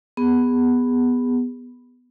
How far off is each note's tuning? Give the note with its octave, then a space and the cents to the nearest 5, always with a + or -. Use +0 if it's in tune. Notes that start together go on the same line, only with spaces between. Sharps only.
B3 +0 G#4 -25